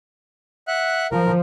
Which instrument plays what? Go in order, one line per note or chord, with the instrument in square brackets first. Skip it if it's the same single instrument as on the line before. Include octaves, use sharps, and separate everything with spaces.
[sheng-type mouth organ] E5 F#5 F#6
[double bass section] F3 [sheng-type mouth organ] A#4